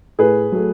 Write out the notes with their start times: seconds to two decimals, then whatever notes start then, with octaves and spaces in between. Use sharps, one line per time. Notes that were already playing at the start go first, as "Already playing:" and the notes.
0.19 A2 G#4 B4
0.52 F#3 A3